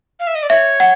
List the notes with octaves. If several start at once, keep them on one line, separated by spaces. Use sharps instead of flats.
F5
E5
D#5
D5
C#5 E5
F#5